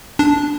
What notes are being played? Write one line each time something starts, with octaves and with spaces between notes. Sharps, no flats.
D4